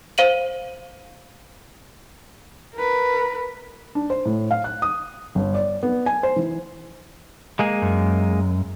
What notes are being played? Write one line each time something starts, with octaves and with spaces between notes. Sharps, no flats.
C5 F5 D#7 F#7
A#4 B4
D4
C5
A2
F5
F#6
D#6
G1
D5
B3
G#5
C5
E3
G#3 A#3 G#4
F#2